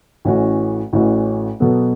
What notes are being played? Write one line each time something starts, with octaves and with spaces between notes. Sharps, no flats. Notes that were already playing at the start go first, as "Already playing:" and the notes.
A1 A2 E3 C#4 F#4
A1 A2 E3 C#4 F#4
B2 F#3 B3 A4